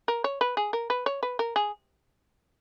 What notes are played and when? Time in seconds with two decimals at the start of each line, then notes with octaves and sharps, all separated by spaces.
0.08 A#4
0.24 C#5
0.41 B4
0.57 G#4
0.73 A#4
0.90 B4
1.06 C#5
1.23 B4
1.39 A#4
1.56 G#4